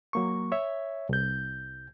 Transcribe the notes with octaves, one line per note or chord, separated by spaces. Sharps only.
F#3 A#3 C#6
C#5 E5
C2 G6